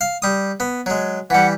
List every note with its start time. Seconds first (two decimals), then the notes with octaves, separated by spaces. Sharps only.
0.01 F5
0.22 G3 D#6
0.60 B3
0.86 F#3 G#3
1.30 E3 G3 F#5